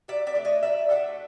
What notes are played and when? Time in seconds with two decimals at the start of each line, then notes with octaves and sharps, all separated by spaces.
0.08 F#3 D5 E5
0.27 D5 E5
0.35 A3 D4
0.45 C#5 D#5
0.63 F#3 D5 E5
0.89 A3 D4 E5 F#5